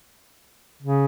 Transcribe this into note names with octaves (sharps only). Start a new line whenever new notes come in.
C#3